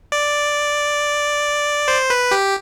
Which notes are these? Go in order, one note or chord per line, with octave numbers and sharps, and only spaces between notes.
D5
C5
B4
G4